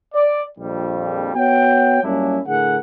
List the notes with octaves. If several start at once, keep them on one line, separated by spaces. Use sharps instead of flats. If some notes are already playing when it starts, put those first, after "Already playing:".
D5
A#1 F2 G3
B3 F#4 C#5 F#5 G5
F#2 G3 A#3 C#4 D4 E4
A2 D3 G#4 A#4 F#5